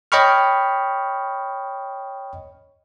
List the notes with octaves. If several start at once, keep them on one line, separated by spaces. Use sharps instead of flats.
C#5 D#5 G5 B5 C#6 F6